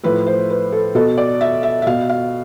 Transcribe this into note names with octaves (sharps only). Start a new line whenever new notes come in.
A2 F3 B4
C5
B4
A4
B2 A4
D5
E5
E5
E5
B2 F5
F5